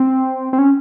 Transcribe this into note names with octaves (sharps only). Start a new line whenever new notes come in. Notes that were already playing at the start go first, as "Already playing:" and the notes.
Already playing: C4
C4
C#4